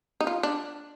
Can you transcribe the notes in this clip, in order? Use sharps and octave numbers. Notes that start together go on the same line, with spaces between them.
D#4
F4
D4